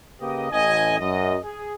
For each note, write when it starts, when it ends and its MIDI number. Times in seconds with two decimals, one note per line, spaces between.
0.21 0.49 49
0.21 0.49 58
0.21 0.49 67
0.21 0.49 71
0.21 0.49 75
0.51 0.97 33
0.51 0.97 45
0.51 0.97 75
0.51 0.97 80
0.99 1.37 42
0.99 1.37 75
1.44 1.73 68